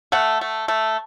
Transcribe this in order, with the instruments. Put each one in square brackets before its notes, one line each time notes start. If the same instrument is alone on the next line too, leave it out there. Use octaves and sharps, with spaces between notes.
[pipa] A3 F#5
A3
A3